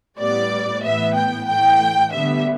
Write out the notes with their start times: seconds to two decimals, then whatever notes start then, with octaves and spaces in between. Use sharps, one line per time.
0.19 A2 G3 B3 D5
0.83 A2 E3 B3 E5
1.15 G5
1.48 A2 E3 A3 G5
2.12 D3 G3 B3 E5